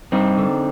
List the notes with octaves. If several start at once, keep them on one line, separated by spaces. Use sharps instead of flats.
G2 C4 D#4
D3